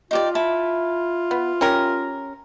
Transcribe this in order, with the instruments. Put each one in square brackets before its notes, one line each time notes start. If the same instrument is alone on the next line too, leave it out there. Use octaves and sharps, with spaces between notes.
[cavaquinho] D#4 G4 D5 [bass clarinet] F4
[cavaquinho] E4 A5 B5
[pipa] B3
C#4 G4 A#4